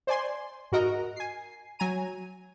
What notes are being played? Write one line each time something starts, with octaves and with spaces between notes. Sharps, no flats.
C5 D5 G#5 C6
G#2 F#4 A#4 D#5 A#5
G#5 C7
F#3 G#5 A#5 D#7